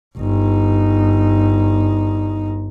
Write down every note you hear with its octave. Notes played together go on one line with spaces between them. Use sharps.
G1 D#4